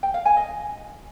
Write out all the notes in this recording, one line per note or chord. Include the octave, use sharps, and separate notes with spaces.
G5
F5
G#5
D#5